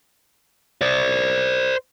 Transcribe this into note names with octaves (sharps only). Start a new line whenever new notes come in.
C5 D5